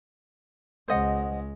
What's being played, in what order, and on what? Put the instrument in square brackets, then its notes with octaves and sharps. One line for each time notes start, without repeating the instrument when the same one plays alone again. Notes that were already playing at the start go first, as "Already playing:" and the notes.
[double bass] C#2 G#3 [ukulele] C5 D#5 F#5